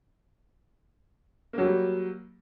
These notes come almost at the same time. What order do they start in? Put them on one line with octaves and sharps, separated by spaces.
A#3 F#3 G3